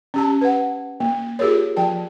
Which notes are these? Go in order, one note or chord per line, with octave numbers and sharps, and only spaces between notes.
C#4 G4 A5
B4 F#5
A#3
F4 G4 G#4 A#4 C#5
F3 G5 A5